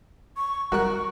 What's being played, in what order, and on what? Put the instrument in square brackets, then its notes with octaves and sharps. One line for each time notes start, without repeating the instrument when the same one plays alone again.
[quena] C#6
[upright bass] G3 [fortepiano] F#4 A#4 F#6 [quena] C#6